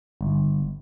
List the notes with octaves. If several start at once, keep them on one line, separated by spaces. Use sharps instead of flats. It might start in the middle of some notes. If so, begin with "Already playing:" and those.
G1